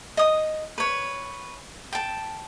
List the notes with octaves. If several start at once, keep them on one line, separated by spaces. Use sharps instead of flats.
D#5 D#6
B4 C#5
G5 A5